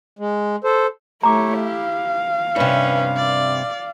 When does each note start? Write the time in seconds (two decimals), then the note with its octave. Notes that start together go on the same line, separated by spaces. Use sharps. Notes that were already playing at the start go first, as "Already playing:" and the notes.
0.19 G#3
0.64 A4 C5
1.23 A3 E4 G4 C#5 A#5 D6
1.63 F5
2.56 G2 C3 C#4 B4
3.17 D5